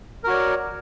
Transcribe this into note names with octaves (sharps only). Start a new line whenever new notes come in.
F#4 A#4 C#5 D5